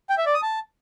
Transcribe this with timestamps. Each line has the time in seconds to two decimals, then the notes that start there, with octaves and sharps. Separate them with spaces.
0.10 G5
0.18 E5
0.26 D5
0.34 D#6
0.42 A5